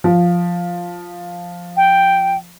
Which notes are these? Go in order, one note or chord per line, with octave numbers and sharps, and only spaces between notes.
F3
G5